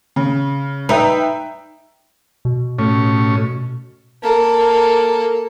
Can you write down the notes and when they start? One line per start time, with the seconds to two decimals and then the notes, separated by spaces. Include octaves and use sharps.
0.16 C#3
0.89 D#4 B4 E5 G5
2.45 B2
2.79 A2 C#4
4.23 A#3 A4